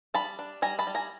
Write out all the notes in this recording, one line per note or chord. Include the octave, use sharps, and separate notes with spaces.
G3 A5 B5
D4
G3 G#5 A#5
A5 B5
G3
G#5 A#5